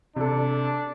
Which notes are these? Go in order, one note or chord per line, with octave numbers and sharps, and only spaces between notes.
C3 D4 A4